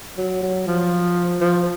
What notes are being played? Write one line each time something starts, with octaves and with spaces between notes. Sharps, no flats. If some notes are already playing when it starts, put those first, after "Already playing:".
F#3
F#3
F3
F3